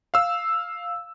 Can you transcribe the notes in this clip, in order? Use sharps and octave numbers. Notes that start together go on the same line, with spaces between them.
F5 E6